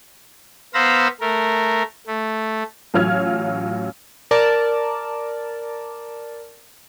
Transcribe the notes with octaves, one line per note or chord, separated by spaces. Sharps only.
B3 C5 F5 A#5 B5 E6
A3 A#4
A3
A1 F#3 F4 C#5 F6 G#6
A#4 D5 A5